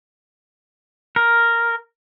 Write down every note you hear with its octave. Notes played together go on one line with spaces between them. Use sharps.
A#4